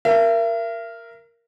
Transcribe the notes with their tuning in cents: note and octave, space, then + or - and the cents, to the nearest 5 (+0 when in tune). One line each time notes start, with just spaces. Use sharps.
A#4 +0 E5 +40